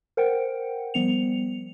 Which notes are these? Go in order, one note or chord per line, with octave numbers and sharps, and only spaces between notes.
A#4 C5 F#5 G5
F3 G3 B3 C#7 F7